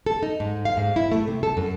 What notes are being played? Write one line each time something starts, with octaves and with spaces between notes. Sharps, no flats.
A4
D#4
G#2
F5
G#2
E4
A3
C3
A4
F#2